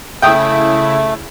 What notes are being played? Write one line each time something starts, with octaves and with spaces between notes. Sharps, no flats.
C#3 A3 E4 G5 D#6